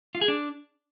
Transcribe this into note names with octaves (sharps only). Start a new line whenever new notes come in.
F4
G#4
D4